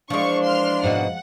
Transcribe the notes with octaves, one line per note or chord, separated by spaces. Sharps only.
E3 F3 G#3 A#3 D4 F5 C#6
C6 F6
G#2 B2 F#5